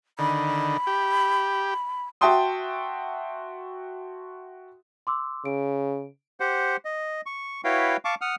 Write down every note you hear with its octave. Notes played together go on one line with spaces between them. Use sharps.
D3 D#3 B5
G4
F#4 E5 G5 A5 C6 D#6
C6 D6 E6
C#3 D7
G4 C5 F#5
D#5
C#6
E4 F#4 B4 C#5 F5 G5
F5 A5 C#6 D6
F#5 D#6 F6